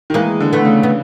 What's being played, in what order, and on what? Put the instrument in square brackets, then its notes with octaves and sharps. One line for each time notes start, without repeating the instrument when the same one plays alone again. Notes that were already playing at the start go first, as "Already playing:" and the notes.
[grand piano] D#3
[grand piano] E3 [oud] G#3 A#3
[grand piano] D3
[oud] A3 B3
[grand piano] C#3
[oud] B3